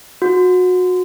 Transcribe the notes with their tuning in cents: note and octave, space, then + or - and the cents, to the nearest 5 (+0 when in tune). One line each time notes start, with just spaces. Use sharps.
F#4 -25